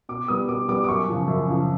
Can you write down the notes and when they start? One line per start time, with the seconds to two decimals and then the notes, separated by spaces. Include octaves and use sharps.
0.09 B2 D6
0.28 G3 B3 D#6
0.49 B2 D6
0.68 G3 B3 D6
0.84 D6
0.88 F#2 C#6
1.08 C#3 F3
1.28 F#2
1.48 C#3 F3